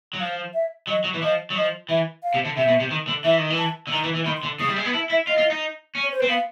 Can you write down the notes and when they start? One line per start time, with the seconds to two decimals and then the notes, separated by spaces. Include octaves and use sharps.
0.13 F#3
0.20 F3 F5
0.53 E5
0.87 F#3 D#5
1.04 F#3
1.14 E3
1.22 F3 D#5
1.50 F#3
1.55 F3 D#5
1.89 E3 E5
2.23 F5
2.34 C3
2.45 D3
2.56 C3 E5
2.68 B2
2.80 C3
2.91 D#3
3.07 D3
3.24 E3 E5
3.38 D#3
3.50 E3
3.58 A5
3.87 D3
3.92 D#3 A#5
4.04 E3
4.15 E3
4.26 D#3 B5
4.37 C6
4.43 D3
4.60 C#3 D#6
4.68 G3
4.76 G#3
4.85 B3
4.93 E4 A5
5.10 E4 E5
5.27 F4 D#5
5.38 F4
5.50 D#4
5.95 C#4
6.03 C#5
6.12 C5
6.20 C4 B4
6.28 B3 F5